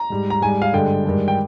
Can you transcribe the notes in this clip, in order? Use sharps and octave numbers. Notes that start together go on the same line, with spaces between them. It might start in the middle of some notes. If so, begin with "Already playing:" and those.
Already playing: A#5
G#2 G3
A#5
G#2 G3 G#5
F5
G2 D3 G#3 G5
G2 D#3 G#3
G5